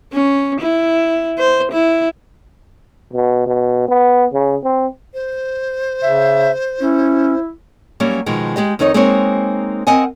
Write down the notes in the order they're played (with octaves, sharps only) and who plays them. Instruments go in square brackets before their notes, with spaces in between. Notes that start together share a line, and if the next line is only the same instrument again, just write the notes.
[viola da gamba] C#4
E4
C5
E4
[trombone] B2
B2
B3
C#3
C4
[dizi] C5
[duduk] C#3 [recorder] E5
[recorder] C#4 [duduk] E4
[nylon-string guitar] F#3 G3 A#3 C#4
B2 D#3 F3 G#3
G#3 G4 D#5
F2 D#3 D#4 C#5 D#5
G#3 A#3 C4 D#4 C5 C#5
C4 A#4 D#5 F#5 G#5